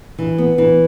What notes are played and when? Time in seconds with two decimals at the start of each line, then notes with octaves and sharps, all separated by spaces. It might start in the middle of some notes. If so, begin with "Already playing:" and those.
0.19 E3
0.38 B3
0.58 E3